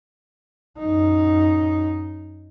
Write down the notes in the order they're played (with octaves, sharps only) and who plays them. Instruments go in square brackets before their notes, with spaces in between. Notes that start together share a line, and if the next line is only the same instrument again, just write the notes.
[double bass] F#2 D#4